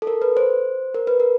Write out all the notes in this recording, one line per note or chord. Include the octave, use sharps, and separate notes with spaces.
A4
A#4
B4
C5
A#4
B4
A#4